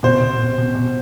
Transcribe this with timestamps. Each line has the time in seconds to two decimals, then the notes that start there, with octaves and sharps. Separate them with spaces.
0.03 B2 C5
0.21 B2
0.39 B2
0.58 B2
0.75 B2